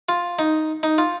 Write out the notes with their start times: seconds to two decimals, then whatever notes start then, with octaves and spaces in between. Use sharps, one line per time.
0.09 F4
0.39 D#4
0.83 D#4
0.98 F4